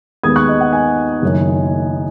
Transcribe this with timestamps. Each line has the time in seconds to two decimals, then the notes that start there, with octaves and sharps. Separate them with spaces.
0.23 D#2 D#3 G#3 B3 D#6 G#6
0.36 C#6 F#6
0.48 D#5
0.61 F#5
0.73 D#5 G#5
1.22 F#1 F#2 D#3